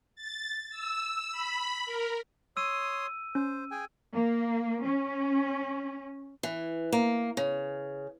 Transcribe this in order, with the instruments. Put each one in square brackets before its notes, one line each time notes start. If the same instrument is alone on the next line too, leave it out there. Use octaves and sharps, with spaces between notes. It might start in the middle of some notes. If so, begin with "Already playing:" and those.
[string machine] A6
E6
B5
A#4
[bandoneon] C#5 C6 D#6 [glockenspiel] E6 D#7
[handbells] C#4 [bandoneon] C5
[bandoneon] G#4 G5 G#5
[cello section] A#3
C#4
[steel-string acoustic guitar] E3
A#3
C#3